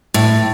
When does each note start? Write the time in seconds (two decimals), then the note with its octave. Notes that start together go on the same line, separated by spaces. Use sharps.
0.14 A2